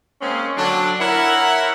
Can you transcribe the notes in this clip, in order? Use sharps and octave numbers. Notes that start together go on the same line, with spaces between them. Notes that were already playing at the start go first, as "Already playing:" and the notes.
G#3 A#3 C4 C#4
D3 F#3 D4
E4 A#4 C#5 E5 F#5 B5